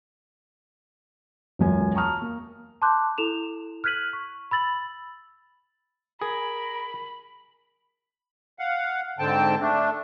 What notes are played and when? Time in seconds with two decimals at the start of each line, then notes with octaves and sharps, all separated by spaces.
1.59 E1 C#2 F#2 G#5
1.94 A5 A#5 C#6 D#6 F6
2.22 A#3
2.82 A5 C6 D6 F#6 G6
3.18 E4 A4 E7 F7
3.84 F6 F#6 G#6 B6 D#7 F#7
4.13 C#6
4.51 B5 E6 A6 F#7
6.22 G#4 A#4 B5
8.59 F5 F#5
9.19 G#2 D3 C4 G5 A5
9.61 A3 D4